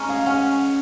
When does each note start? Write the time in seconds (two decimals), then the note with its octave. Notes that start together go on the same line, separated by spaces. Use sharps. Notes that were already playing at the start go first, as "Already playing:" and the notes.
Already playing: G#3 C#4 A#5 C#6
0.09 G#4 F5
0.26 C#4 F#5